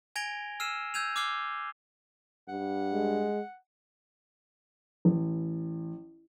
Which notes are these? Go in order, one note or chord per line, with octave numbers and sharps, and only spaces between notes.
G#5 G#6 A#6 D7 F7 G7
E6 F6 C7 D#7 E7
E6 G6 G#6 D#7 F7
D6 E6 F6 G#6 C7 G7
G2 F#5
G#3
A1